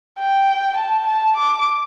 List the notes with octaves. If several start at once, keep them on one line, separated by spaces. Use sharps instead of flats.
G5
A5
A5
D6